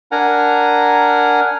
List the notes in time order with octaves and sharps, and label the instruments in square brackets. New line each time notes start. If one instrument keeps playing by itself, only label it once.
[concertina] D4 A#4 F#5 G#5 A#5